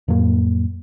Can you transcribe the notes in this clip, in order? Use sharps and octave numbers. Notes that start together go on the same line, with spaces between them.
F2 A2 F#3 A#3